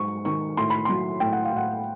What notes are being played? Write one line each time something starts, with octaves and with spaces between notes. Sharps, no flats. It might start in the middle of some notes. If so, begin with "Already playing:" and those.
Already playing: G#2 F#3 C#6
D#3 C#6
A2 C6
B5
F#3 C6
A2 G5
F#5
F5
A2 F#5